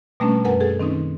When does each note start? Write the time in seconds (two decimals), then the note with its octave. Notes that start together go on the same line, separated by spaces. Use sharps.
0.20 B2 G3 A3 A#3 C#4 D4
0.44 F#2 A#4 B4 F#5 G#5
0.60 G#4 A4
0.80 D#3 C4 C#4 D#4